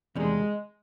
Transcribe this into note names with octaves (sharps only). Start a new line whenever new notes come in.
E2 C3 D#3 G3 G#3